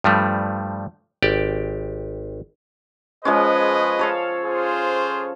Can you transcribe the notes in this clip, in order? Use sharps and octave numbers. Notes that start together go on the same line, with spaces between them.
G2 F3 G3 A3
G#1 G4 D5
F3 G#3 C#4 G#4 B4 D#5
A4 C#5 F5
F4 G#4 C5